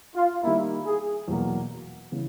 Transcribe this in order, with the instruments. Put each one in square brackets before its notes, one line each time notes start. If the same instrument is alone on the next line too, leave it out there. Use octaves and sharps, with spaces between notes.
[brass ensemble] F4
[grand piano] D#3 G3 A#3 [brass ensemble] E4
[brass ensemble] G#4
[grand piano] E2 B2 F#3 A#3
C#3 E3